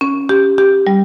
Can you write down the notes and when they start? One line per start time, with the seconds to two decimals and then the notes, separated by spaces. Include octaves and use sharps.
0.01 C#4
0.29 G4
0.58 G4
0.87 G3